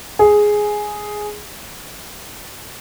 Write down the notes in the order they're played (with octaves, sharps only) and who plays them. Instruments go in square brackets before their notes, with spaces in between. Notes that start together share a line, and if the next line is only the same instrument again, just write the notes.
[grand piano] G#4